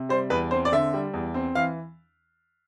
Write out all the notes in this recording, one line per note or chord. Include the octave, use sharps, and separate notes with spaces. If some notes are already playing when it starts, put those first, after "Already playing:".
Already playing: C3
G3 C5
E2 B4
C4 C5
D5
D3 E5
G3
E2
C4
E3 F5